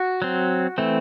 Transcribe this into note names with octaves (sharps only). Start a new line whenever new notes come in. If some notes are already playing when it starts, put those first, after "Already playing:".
Already playing: F#4
F#3 C4
E3 A3 C4